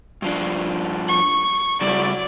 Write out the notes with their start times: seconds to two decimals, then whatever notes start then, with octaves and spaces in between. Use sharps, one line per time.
0.22 G2 F3 D4
1.08 C#6
1.81 C#3 F#3 G3 E4 D5